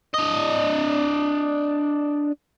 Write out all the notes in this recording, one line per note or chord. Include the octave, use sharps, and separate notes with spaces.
D4 D#5